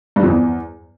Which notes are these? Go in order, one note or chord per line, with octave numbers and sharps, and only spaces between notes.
G2
F2
E2